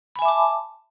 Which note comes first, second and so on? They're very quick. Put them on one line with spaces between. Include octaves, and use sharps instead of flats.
B5 G#5 E5 D6 A5